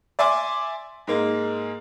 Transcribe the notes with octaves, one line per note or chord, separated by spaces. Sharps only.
D5 E5 G#5 C6 D6
G#2 G#3 A#3